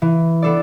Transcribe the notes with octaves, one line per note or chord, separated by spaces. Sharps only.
E3
B3 D4 A4 D5